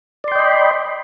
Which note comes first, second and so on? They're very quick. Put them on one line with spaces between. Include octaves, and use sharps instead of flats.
D5 C6 G5 D#5 B5